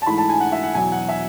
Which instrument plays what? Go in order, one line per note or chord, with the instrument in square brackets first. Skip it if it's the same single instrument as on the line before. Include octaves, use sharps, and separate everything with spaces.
[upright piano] A5
G#2 E3 A3 E4 B5
A5
G#5
F#5
E5
F#5
E2 B2 F#3 G#5
F#5
E5